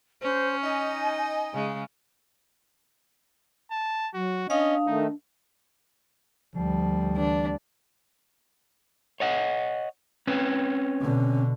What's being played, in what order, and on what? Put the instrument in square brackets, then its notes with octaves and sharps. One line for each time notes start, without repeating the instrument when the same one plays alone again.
[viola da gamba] C#4 [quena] C5
[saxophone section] D#4 D#5 [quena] G#5
[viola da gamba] C#3 G#3
[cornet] A5
[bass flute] F#3 [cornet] F#4
[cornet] C#4 [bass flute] D4 [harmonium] D#5 [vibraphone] F5 D#6
[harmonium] D#3 A3 [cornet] D#4
[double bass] D2 G3 [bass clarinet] F3
[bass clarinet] E3 [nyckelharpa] D4
[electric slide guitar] C#5 D#5 F#5
C4 C#4 B4
[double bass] B2 D3